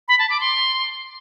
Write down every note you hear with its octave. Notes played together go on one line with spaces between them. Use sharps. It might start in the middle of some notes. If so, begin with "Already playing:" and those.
B5
A5
D6
C6